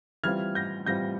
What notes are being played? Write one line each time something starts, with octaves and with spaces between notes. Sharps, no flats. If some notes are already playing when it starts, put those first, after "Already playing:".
E3 G3 C4 F4 F6 G#6
G6 A#6
E3 G3 C4 F4 G6 A#6